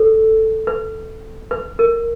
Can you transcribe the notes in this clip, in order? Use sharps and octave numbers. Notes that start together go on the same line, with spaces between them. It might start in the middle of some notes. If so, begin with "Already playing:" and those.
Already playing: A4
B4
B4
A#4